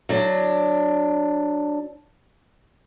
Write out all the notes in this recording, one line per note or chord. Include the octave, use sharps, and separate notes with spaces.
F#3 D4